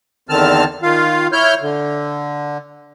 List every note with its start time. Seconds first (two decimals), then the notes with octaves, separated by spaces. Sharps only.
0.29 E2 D3 D#3 C4 A5 F6
0.83 D#3 F4 F5
1.32 E4 C#5 F6 G6
1.61 D3